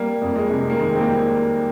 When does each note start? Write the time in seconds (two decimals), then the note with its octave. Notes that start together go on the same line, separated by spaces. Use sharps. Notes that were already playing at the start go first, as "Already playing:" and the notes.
Already playing: G3 A#3
0.22 F2
0.36 G#3
0.50 C3
0.70 A#3
0.79 D#3 G#3
0.95 C4
1.01 A#3
1.08 G3